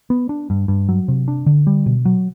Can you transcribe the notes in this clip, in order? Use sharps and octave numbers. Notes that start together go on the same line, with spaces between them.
B3
D4
G2
G2
F#3
C3
D4
D3
G3
B2
F#3